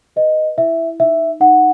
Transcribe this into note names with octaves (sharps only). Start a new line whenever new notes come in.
B4 D#5
E4 E5
D#4 E5
D#4 F#5